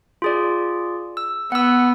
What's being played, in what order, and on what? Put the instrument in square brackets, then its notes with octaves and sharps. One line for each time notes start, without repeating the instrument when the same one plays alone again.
[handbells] F4 G#4 D5
E6
[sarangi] B3 [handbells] F#5 E6